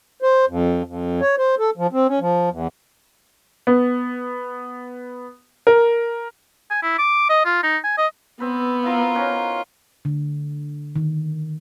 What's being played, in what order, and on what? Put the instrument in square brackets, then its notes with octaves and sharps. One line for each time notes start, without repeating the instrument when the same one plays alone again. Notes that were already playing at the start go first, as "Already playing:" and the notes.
[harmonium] C5
F2
F2
C#5
C5
A4
F3
C4
C#4
F3
E2
[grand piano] B3
A#4
[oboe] G#5
E4
D6
D#5
F4
D#4
G#5
D#5
[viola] B3 [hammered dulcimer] C4 B4
[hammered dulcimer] E4 A#4 [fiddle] F4
[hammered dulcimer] C#4 D#4 F#5
[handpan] D3
D#3